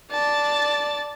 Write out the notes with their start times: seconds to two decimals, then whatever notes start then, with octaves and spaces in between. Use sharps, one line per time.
0.12 D5 A5